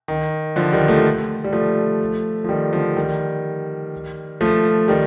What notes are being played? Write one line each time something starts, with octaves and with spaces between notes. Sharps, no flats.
D#3
D3 F3
D#3 G3
F3 A3
G3
F3 A3
F3
D#3 G3
D3 F3
D#3 G3
F3 A3
D#3 G3